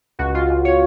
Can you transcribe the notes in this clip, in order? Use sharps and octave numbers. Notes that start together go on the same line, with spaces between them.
C#2 F#4
C#2 F4
C#2
C#5